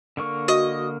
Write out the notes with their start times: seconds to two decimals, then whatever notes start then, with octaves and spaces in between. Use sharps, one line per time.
0.17 D3 A#3 C#6
0.48 F#4 D#5